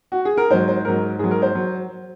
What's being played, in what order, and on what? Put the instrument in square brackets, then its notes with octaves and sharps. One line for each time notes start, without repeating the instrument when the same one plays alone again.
[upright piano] F#4
G#4
A#4
G#2 F#3 C5
C5
G#2 F#3 A#4
G#2 G#4
F#3
A#4
C5
F#3